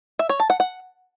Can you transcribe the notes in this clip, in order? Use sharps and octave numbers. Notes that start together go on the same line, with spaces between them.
E5
C#5
A5
F#5
F#5